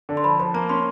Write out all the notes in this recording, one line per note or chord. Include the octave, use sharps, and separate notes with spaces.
D3
C6
F3 B5
F3
A#3 A#5
C#4 C6